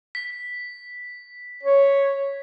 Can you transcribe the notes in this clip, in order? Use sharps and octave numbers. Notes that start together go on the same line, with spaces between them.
B6
C#5